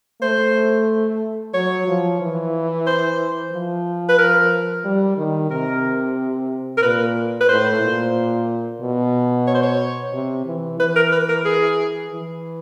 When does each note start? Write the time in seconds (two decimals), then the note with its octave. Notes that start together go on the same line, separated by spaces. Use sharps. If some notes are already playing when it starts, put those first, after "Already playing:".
0.22 A3 C5
1.54 F#3 C#5
1.87 F3
2.21 E3
2.87 C5
3.52 F3
4.09 B4
4.19 A#4
4.84 G3
5.17 D#3
5.50 C3 A#4
6.77 A#4
6.82 A#2 B4
7.41 B4
7.49 A2 C5
7.82 A#2
8.81 B2
9.47 C#5
9.54 C5
9.63 C#5
10.13 C3
10.46 E3
10.79 E3 B4
10.96 A#4
11.12 B4
11.29 A#4
11.45 G#4
12.11 E3